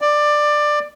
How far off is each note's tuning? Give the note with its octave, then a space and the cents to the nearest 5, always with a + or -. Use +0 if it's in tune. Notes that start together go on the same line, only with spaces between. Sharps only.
D5 +15